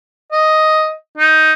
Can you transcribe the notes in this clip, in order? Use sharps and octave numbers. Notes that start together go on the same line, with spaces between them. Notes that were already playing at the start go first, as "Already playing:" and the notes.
D#5
D#4